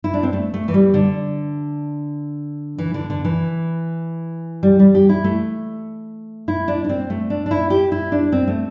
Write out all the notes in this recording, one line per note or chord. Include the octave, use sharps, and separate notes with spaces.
E4
D4
C4
A3
A3
E3
G3
D3
E3
D3
D3
E3
G3
G3
G4
E4
A3
E4
D4
D4
C4
A3
D4
D4
E4
G4
E4
D4
C4
A3